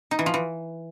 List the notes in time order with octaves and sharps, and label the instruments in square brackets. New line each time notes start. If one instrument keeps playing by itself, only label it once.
[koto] D#4
E3
F3
E3